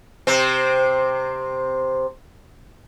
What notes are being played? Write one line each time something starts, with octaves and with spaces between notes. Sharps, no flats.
C3 C4